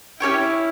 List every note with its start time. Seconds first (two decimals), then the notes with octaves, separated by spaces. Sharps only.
0.20 C#4 E4 G4 C#5 G5